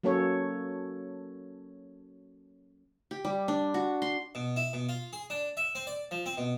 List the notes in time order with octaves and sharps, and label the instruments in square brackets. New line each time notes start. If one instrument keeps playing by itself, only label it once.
[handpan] F#3 A#3 C#4 A4 C#5
[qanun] G4
G3
D4
F#4
C6
[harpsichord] B2
E4
B2
F4
G#4
D4
E5
C4
D5
F3
C4
B2